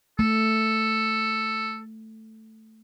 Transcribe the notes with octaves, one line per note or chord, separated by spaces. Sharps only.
A3 A4